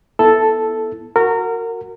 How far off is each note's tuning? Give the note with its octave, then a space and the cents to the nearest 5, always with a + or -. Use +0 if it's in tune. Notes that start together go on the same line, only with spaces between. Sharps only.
B3 +0 E4 +0 A4 +0
F#4 -5 A#4 -25